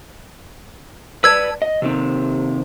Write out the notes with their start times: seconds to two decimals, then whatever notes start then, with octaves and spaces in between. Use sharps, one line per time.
1.24 B4 D5 A5 E6 G#6
1.62 D#5
1.82 C3 D#3 C4